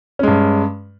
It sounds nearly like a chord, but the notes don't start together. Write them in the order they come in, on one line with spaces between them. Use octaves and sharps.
C#4 G#3 G2